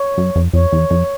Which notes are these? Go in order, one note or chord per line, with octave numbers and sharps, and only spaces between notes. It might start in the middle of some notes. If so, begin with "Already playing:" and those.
Already playing: C#5
F#2
F2
F2 C#5
E2
F2